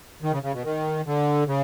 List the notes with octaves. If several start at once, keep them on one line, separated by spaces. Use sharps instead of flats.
D#3
C#3
C#3
B2
D#3
D3
C#3